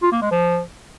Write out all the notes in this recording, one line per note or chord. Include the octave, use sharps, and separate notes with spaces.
F4
A#3
G#3
F3